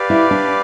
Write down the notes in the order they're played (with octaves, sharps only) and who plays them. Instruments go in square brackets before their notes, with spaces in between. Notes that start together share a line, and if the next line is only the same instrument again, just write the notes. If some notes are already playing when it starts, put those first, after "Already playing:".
Already playing: [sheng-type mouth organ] G4 B4 D5 F5
[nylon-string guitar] E4
D4